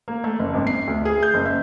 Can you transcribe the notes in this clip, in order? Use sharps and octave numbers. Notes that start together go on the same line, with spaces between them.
A#3
A3
F#1
G#1
C7
D2
G#4
G6
F#1
E5